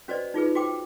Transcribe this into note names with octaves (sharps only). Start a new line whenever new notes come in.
C#4 F#4 B4 C5 D5 D#5
D#4 F4 G#4 B4
F#4 C5 G5 D6